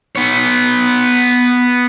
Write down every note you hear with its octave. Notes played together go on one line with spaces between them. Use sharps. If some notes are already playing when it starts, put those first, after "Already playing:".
B3 C#5